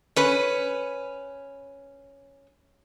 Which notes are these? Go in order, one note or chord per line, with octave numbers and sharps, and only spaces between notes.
C#4 B4